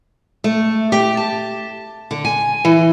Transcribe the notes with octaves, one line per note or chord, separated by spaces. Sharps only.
A3
G4
A5
D3
G#5
E3